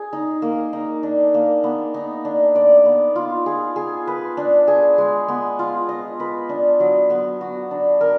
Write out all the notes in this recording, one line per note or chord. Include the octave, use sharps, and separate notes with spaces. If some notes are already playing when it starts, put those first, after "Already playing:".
Already playing: G#4
D#4
A#3
D#4
D4
A#3
B3
D#4
D4
D5
B3
F4
G#4
G#4
B4
D4
G#4
G#3
B3
F4
D#5
B4
D4
F#3
B3
F#4
D4
A#4